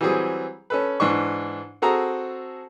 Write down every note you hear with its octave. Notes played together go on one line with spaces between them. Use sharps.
E3 F#3 G3 C4 G#4
C#4 A4 B4
G#2 E3 D4 C#6
C4 F#4 G#4 A4 A#5